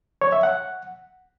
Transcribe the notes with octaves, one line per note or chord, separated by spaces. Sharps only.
C#5
E5
F#5